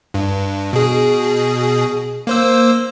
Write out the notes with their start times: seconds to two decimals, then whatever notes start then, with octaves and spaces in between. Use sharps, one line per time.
0.14 G2
0.73 B2 G#4
2.27 A#3 C5 E6